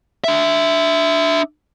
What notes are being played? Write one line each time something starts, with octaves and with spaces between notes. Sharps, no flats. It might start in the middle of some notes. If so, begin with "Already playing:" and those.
D4 E5